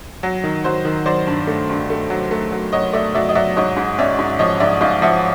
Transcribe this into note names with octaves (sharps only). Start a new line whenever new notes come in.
F#3
D#3
F#3 C5
D#3
F#3 C5 D5
G2
A3
G2
A3
F#3
A3
F#3
F#3 C#5 D#5
A3 D5 E5
F#3 D5 E5
D#5
F#3 D5 E5
G#2 C#5 D#5
G#2
C#4 D5 E5
G#2
F3 C#5 D#5
G#2 D5 E5
G#2 D#5 F5
F3 E5 F#5